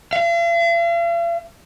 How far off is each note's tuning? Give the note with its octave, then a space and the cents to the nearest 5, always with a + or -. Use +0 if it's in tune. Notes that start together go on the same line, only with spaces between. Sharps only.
F5 -45